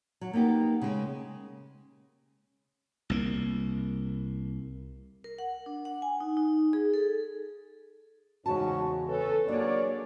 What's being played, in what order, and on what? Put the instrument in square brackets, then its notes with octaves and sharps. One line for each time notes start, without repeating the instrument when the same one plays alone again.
[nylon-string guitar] F#3
A#3 B3 D#4 G4
C#3 G#3
[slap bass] C2 A#3
[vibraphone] A#4
F#5
D4
F#5
G#5
D#4
D#4
G#4
A4
[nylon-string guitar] E2 C#3 A5 [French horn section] G#2 C#4 [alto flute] F#4
[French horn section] C#4 A4 [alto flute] B4
[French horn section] F#3 C#5 D5 [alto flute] A#3 [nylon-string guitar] D4 G#4